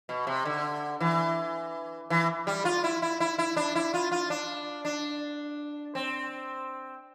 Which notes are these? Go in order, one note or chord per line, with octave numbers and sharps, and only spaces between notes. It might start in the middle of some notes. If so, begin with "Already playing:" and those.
B2
C3
D3
E3
E3
G3
F4
E4
E4
E4
E4
D4
E4
F4
F4
D4
D4
C4